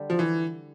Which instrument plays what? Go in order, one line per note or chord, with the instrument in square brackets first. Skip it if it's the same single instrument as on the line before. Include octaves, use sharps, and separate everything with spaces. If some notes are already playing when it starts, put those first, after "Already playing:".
Already playing: [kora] D3 G3 D4 G4
[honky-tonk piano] F3
E3